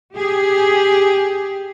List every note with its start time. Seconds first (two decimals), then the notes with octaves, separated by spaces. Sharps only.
0.14 G4 G#4